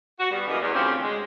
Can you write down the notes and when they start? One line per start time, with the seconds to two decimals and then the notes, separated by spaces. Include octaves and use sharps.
0.19 F#4
0.32 G3 B3
0.47 F#2 C#3 E3 G3 A#3 D#5
0.60 E2
0.74 D2 C#3 C4 C#4 F4 G4
1.01 G#3